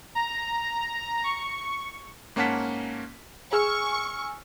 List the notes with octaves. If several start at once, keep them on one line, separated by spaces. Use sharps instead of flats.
A#5
C#6
G#2 A#3 C#4 F#5 A5 B6
G#4 G#5 C#6 E6 F6